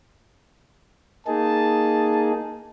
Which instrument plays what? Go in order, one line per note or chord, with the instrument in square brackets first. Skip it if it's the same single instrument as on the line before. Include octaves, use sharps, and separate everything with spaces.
[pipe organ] A#3 D#4 G#4 [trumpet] A5